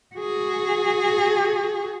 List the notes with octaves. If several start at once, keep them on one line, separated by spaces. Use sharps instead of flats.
F#4 G#4